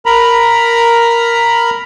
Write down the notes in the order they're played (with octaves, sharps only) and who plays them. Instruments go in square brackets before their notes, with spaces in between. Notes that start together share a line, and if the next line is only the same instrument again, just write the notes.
[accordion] A#4 A#5 B5